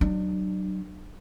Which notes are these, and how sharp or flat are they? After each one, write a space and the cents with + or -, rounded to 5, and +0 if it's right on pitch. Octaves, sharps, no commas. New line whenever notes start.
F#3 +30 D4 +35